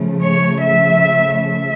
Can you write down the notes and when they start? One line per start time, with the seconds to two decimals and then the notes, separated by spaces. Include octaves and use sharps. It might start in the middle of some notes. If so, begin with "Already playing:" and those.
Already playing: C#3 F3 A3
0.22 C#5
0.62 E5
1.42 E5